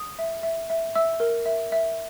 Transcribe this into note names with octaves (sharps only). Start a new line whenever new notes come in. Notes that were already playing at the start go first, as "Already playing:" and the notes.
Already playing: D#6
E5
E5
E5
E5 E6
A#4
E5
E5